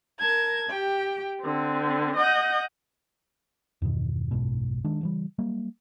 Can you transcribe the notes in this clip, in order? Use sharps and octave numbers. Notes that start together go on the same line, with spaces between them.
A#4 A5 G#6
G4 G5
D3 C4
D#5 F#5 G6
E2 G2 B2 D#3
F#1 B1 G#2 B2
D#3 G#3 D4
C#3 E3 G3
F#3 G3 A#3